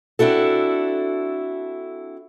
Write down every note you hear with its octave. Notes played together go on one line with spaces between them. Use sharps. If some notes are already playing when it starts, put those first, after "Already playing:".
C4 D4 E4 F#4 A4